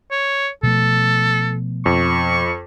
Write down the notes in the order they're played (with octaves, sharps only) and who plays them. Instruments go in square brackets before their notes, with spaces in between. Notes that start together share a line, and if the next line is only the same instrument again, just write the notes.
[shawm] C#5
[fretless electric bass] B2 F3 A3 [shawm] A4
[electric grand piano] F2 [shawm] C#6